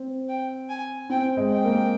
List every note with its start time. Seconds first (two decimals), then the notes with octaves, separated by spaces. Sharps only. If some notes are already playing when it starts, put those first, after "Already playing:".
Already playing: C4
0.29 G5
0.69 G#5
1.10 C4 G5
1.37 G#3
1.50 G5
1.64 A#3